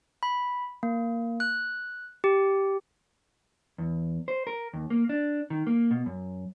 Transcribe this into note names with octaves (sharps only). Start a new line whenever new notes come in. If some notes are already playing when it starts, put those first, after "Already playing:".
B5
A#3
F#6
G4
E2
C5
A#4
D#2
A#3
D4
D#3
A#3
B2
F#2